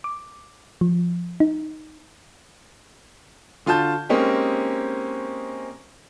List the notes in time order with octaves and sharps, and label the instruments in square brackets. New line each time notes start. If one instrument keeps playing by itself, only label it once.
[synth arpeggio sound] D6
F3
D#4
[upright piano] D3 F4 F#4 A5 G6
G#3 A#3 C4 C#4 D#4 G4